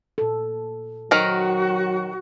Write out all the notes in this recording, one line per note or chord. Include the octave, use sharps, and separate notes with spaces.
A#2 A4
D#3 F#3 F#4 A#4 C5